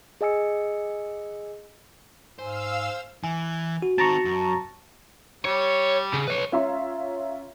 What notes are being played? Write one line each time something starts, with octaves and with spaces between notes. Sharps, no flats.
G#4 D#5 G#5 E6 C#7
G#2 C5 F5 G#5 E6
E3 G#5
F#4
D#3 C4 A5 A#5 C#6
F#2
G3 C#5
C#3
B4 C#5
C#4 F4 E5 A#5 C6